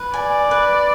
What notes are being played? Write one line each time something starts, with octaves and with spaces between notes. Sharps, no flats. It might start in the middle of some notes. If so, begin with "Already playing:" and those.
Already playing: B4
D5 G#5
B4